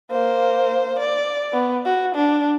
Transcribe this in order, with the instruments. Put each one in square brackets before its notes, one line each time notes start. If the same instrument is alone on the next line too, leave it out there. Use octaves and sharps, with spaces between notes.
[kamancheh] A#3 C5
D5
B3
F#4
D4